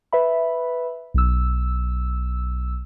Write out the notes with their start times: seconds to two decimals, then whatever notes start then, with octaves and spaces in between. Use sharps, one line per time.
0.12 B4 E5 B5
1.14 B1 E6